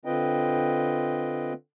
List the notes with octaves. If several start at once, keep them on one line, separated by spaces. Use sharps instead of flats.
D3 C4 F4 B4 D#5 G5